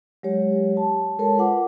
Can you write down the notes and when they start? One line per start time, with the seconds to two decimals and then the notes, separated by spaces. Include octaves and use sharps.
0.23 F#3 G#3 G4 C#5
0.77 A5
1.19 G#3 A4 A#4 C#5 A5
1.38 F4 B4 F#5 D6